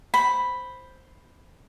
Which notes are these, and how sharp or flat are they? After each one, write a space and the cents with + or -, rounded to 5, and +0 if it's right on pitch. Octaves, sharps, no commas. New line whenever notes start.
C5 +0 B5 +0